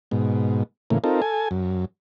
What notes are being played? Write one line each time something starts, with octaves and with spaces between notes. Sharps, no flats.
G#2 B2
A2 C#3 E3 A#3
C4 D#4 F4 A4 A#4
A4 G#5
F#2